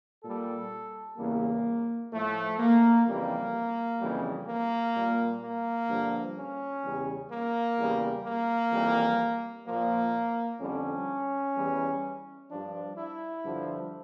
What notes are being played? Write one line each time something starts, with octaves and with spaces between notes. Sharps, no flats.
A#2 G3 A4
E2 C#3 G3 A#3
A2 F3 A3
A#3
F2 C#3 E3 G3 A#3
F2 C#3 E3 G3
A#3
A#2 G3
A#3
G2 D3 F3
C#4
E2 C#3 G3
A#3
E2 C#3 G3
A#3
F2 E3 G3
A#2 F3 A#3
F2 D3 G3 C#4
E2 E3 G3
G2 F3 D4
E4
G2 D3 F3